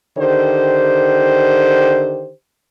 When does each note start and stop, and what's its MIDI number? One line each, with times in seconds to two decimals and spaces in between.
0.18 2.32 50
0.18 2.32 51
0.18 2.32 67
0.18 2.32 72